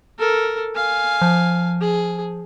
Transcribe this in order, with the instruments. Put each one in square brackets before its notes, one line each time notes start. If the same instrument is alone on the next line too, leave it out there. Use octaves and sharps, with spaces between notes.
[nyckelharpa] A4 A#4
F5 G#5
[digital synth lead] F3
[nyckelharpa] G#4